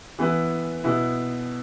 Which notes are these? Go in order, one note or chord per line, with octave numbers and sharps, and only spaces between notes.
E3 B3 E4 B4
B2 B3 E4